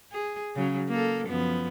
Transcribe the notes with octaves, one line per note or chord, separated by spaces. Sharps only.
G#4
C#3 F#3
A#3 A4
F#2 F3 B3